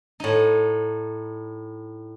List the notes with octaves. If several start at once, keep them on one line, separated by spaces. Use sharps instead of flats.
A2 D#4